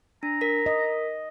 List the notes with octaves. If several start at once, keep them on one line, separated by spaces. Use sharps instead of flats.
D4 A#5
A#4 B6
D#5